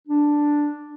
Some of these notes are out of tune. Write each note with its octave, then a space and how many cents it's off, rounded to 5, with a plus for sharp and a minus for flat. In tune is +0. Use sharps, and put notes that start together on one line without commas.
D4 +0